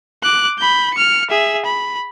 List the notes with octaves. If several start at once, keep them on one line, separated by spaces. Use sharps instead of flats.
D6 F#6
B5 G6
F6 C#7
G#4 E5
B5